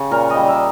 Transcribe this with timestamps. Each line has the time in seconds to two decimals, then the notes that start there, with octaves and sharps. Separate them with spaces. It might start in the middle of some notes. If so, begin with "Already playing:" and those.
Already playing: C#3 G4
0.11 A#2 A#4
0.30 D#5
0.36 G3
0.48 E5